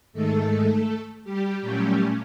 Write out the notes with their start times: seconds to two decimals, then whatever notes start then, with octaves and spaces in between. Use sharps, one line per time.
0.13 G#2 D#3 G#3 A3 A4
1.24 G3 G4
1.61 A#2 F#3 G3 A3 C#4 G4